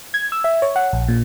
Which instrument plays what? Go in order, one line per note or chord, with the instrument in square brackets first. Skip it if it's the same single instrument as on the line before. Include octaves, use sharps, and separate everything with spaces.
[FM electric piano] G#6
E6
E5
C#5
F#5
A#1
A#2